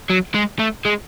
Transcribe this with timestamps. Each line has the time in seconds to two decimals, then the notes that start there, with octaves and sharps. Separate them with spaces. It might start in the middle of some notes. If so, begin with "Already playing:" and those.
0.10 F#3
0.34 G#3
0.59 A3
0.85 G#3